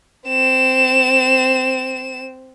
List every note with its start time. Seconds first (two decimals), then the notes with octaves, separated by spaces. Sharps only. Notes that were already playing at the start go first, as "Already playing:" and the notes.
0.28 C4 E7